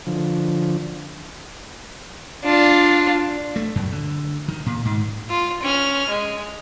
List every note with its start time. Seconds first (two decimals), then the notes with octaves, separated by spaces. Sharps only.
0.07 D3 F3
2.44 D4 F4
3.56 A3
3.75 F#2
3.92 D3
4.48 D#3
4.66 A#2
4.85 G#2
5.29 F4
5.63 C#4 F6
6.09 G#3